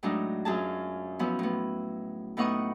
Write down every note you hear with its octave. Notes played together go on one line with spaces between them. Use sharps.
A2 F#3 G#3 D4 D#4
F#2 F4 G#4 A5
F3 F#3 B3 C#4 E4
A2 B3
A2 B3 D#4 F#5 C#6 D#6